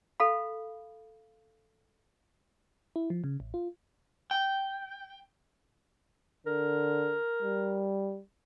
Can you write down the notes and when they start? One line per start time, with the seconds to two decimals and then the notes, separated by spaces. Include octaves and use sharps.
0.20 A4 F5 B5
2.96 E4
3.10 F3
3.24 C#3
3.40 A1
3.54 F4
4.31 G5
6.47 D3 A#4
7.42 G3